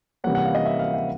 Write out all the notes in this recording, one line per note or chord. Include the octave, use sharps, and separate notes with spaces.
C3 E3 G3 A#3 C#4 F#5
F#5
F5
D#5
E5
F5
E5